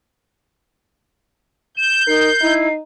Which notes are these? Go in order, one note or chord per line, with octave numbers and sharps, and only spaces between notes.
G6 E7
D#4 A#4 C7
D#4 E4